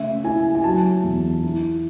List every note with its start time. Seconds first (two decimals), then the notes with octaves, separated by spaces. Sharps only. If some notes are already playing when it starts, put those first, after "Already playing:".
Already playing: C#3 A3 E5
0.24 E4 G#5
0.55 G#5
0.64 F#3 A5
1.04 E2
1.43 E4